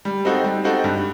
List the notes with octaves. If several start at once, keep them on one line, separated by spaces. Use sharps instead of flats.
G3
C4 D#4 F#4 A4
G3
C4 D#4 F#4 A4
G2